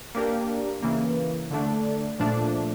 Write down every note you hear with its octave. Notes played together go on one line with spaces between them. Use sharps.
A#3 D4 G4 A#4
C#3 E3 A#3
D3 A3 D4
A#2 F3 A3 D4